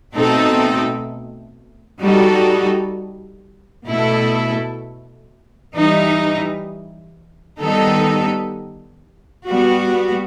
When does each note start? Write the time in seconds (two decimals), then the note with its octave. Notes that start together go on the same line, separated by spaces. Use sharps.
0.13 B2 A3 C4 D#4 A4
2.00 G3 D#4 F#4 A4
3.87 B2 A3 E4 A4
5.73 E3 G3 D#4
7.60 D#3 G3 B3 D#4 A4
9.47 G3 B3 F#4